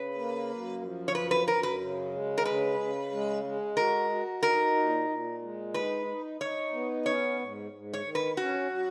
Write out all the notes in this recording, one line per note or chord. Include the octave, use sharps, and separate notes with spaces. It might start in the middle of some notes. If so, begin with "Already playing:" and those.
Already playing: C#3 B4
A#3
F#2
F3
C#5
F#2 B4
B4
F#2 A#4
B4
C#3
G#3
A#4
C#3 B4
C#3
G#3
G#3
F#4 A#4
F#4
D#4 A#4
A#2
A#2
G#3
D#4 B4
D#4
D#4 C#5
B3
C#4 C#5
G#2
G#2
C#5
D#3
B4
C#4 F#4
F#3